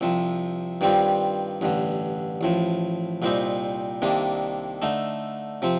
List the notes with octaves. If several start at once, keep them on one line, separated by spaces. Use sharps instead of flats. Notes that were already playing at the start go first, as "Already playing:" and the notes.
C2 C3 F3
G2 D#3 G3 C4 F4
A1 G2 D3
A1 A2 F3
C2 A#2 G3 C4 D#4
C2 C3 D#3 A#3 D4
D3 A3 D#4
C3 F3 C4